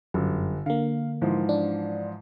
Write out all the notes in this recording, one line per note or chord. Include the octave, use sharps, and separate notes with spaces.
G1 F#2
D3 A#3 F5
G#2 E3 F3
D4